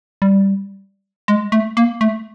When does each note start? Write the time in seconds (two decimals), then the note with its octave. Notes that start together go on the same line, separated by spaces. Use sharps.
0.22 G3
1.28 G#3
1.52 A3
1.77 A#3
2.01 A3